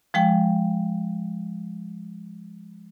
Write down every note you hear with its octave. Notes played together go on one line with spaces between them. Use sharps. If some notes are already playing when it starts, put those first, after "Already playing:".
F3 G#3 G5